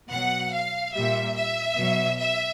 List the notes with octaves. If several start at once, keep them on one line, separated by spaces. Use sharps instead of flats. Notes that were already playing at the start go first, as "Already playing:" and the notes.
B2 F#3 F#5
F5
A#2 G3 E5
E5
B2 F#3
E5